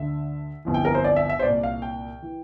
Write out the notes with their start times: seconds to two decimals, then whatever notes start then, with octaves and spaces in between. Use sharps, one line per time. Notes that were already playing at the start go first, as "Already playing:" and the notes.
Already playing: D2 D3 E5
0.65 G1 F2 E3
0.74 G5
0.85 A#4
0.95 C5
1.05 D5
1.16 E5
1.30 E5
1.39 C5
1.43 C2 A#2 D5
1.63 F5
1.82 G5
2.22 E3